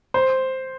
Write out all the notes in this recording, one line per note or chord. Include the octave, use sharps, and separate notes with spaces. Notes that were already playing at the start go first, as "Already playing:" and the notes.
C5